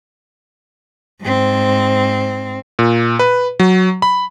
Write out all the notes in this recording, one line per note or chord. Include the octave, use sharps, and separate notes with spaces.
G#2 C4
A#2
B4
F#3
B5